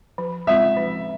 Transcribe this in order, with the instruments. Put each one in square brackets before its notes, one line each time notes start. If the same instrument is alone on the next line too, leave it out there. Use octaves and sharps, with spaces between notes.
[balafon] F3
[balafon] G#3 C4 F4 [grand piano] E5
[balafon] F3